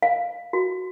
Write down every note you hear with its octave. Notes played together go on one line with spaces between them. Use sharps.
F5
F#4